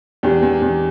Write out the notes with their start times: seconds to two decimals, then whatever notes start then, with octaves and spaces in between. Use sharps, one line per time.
0.23 E2 D4 G4
0.42 E2
0.62 E2